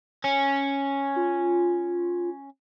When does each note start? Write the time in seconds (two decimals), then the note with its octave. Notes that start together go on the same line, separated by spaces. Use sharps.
0.24 C#4
1.16 F4